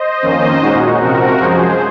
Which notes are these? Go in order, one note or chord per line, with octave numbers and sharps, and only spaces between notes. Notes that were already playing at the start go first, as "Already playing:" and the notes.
Already playing: C5 D#5
F2 D#3 A#3 C#4
A#2 G#3 C#4 D#4 F#4
C3 F3 C4 F#4 A#4
F#2 F3 G#3 G#4 C5